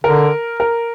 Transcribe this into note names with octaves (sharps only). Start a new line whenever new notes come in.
D3 A#4
A#4